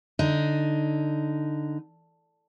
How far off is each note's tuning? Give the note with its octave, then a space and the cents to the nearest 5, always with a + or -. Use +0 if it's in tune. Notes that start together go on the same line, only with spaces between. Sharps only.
D3 +0 D#4 +0 D5 +0